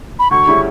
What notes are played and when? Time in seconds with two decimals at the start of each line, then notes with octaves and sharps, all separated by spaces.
0.19 B5
0.31 D2 C#6
0.47 C#3 G3 C#4 E4